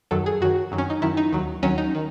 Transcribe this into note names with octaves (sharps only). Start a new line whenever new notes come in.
F#2 D#3 F#3 A4
G#4
F#2 D#3 F#3 F#4
F#2 D#3 F#3
C#4
D#4
F#2 D#3 F#3 E4
D#4
D#2 D#3 F#3
D#2 D#3 F#3 C#4
D#4
D#3